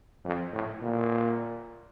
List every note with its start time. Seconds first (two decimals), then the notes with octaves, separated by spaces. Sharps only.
0.25 F2
0.53 A2
0.82 A#2